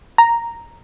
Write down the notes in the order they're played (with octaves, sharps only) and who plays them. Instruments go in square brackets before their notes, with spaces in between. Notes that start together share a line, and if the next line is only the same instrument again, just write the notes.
[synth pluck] A#5